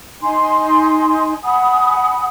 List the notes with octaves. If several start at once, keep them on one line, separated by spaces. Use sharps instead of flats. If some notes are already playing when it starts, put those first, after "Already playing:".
D#4 G#5 C6
F#5 G#5 B5 D#6